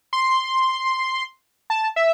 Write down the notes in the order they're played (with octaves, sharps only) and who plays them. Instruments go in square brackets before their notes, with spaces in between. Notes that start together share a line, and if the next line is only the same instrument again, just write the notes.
[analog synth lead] C6
A5
E5